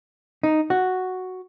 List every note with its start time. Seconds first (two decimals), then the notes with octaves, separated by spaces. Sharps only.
0.43 D#4
0.70 F#4